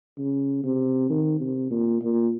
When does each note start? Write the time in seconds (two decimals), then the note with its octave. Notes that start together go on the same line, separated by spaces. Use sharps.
0.18 C#3
0.64 C3
1.10 D#3
1.40 C3
1.71 A#2
2.01 A#2